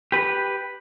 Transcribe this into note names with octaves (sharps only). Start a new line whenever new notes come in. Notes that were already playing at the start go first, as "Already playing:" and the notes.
G4 B4